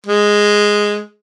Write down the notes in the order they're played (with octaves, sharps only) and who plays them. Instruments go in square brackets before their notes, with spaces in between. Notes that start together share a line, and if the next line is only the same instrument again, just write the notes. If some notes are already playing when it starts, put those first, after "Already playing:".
[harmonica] G#3